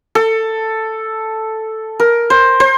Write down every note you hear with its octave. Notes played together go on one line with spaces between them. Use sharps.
A4
A#4
C5
C5